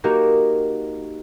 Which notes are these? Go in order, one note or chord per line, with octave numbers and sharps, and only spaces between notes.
A#3 D#4 F#4 G4 A#4